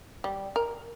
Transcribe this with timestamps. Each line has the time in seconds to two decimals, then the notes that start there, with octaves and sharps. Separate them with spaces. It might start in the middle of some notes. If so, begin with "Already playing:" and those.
0.24 G3
0.56 A#4